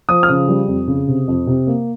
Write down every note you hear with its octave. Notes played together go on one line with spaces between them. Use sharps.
F3 D#6
F6
C#3 D#6
G3
F2
C#3
C3
F2
C3
A#3